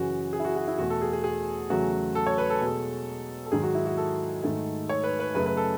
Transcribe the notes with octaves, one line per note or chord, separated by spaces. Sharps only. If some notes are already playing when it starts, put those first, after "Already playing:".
Already playing: F#2 C#3 E3 F#4
G#4
E4
F#4
F#4
E4
E2 B2 A3 F#4
A4
G#4
G#4
G#4
E2 C#3 F#3 A3 F#4
A4
C#5
B4
A4
B2 G#3
A4
G#2 D#3 F#3 G#4
F#4
E4
F#4
A4
G#2 D#3 A3
C#5
B4
B4
F#2 C#3 F#3 A3 B4
B4
A4